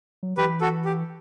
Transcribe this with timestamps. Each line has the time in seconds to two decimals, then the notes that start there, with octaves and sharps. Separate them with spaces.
0.23 F#3
0.37 E3 G4 B4
0.61 F#4 A4
0.85 G4